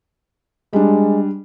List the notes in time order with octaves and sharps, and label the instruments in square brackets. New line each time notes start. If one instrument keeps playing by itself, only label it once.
[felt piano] G3 D4 [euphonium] G#3